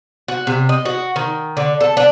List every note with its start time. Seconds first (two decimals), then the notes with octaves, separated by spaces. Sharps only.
0.28 F#4
0.47 C3
0.69 D#5
0.85 F#4
1.16 D#3
1.57 D3
1.81 A4
1.97 D4